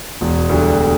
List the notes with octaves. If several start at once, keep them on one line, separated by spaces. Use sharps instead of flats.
E1
D2 D3 G3